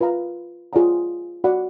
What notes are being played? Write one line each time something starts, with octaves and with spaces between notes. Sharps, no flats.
F4 B4 F5 A#5
F4 G#4 D5 F#5 A#5
F#4 D5 F#5 B5